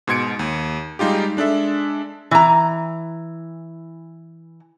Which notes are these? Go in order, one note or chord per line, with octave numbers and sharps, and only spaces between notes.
G#2 B2 C6 G#6 C#7 D7
D#2
G3 G#3 D#4 F4 G4
G#3 D4 A4 E5
E3 A#5